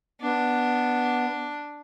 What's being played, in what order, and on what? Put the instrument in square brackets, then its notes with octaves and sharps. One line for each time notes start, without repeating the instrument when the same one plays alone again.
[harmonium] B3 [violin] D4